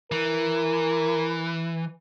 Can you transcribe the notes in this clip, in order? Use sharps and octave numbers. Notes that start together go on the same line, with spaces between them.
E3 A#4